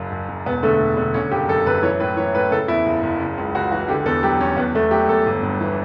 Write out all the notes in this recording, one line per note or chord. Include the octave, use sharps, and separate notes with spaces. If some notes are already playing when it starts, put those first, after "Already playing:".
Already playing: F#1 F#2
F#1
F#1
E1 B3
D3 A3
E1
D3
D3 C#4
F#1 G4
F#2 A4
F#2 B4
E3 C#5
A2 B4
E3 C#5
A2 B4
C#3 A4
E2 E4
F#1
F#1
C#3
C#2
C#2 F#4
E3 F#4
D3 G4
E2 A4
F#3 G4
E2 C#4
E2 B3
E2 A3
F#3 G4
E2 A4
G1
G2
E3